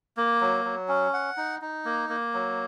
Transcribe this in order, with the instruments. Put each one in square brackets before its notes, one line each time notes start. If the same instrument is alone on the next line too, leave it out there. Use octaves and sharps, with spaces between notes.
[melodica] A#3
F#3
F#3
C#4
F#5
D#4
D#4
A#3
A#3
F#3